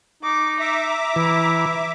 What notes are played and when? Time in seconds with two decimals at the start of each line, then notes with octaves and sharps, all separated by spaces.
0.23 D#4 D6
0.60 E5 A#5 D6
1.16 E3 E4